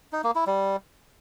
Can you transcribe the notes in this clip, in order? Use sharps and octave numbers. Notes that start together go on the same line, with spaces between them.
D#4
A#3
E4
G3